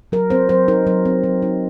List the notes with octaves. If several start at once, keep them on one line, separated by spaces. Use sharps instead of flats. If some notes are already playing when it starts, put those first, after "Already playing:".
F#3 A#4
C4 C5
F#3 C5
D#4 A#4
F#3 A#4
C4
F#3
D#4